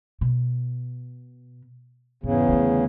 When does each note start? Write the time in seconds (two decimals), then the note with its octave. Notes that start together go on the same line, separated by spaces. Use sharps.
0.21 B2
2.23 E2 G#2 C#3
2.48 D3 A3